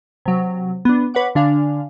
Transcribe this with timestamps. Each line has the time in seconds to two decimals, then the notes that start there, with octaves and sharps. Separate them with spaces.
0.26 C3 F#3
0.85 B3 D4
1.14 B4 C#5 F#5 D6
1.35 D3 D4 F5 G#5